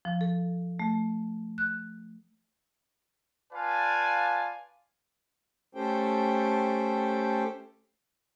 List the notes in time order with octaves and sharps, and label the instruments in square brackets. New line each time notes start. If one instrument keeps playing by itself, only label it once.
[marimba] F3
A4
A3
F#6
[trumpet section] F4 B4 D5 F5 G#5 A5
[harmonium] A3 C#4 G4 A4 C5 G5